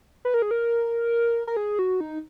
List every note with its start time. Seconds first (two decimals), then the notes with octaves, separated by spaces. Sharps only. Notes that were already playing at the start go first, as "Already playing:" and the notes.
0.25 B4
0.34 A#4
0.42 G#4
0.51 A#4
1.47 A#4
1.57 G#4
1.79 F#4
2.01 D#4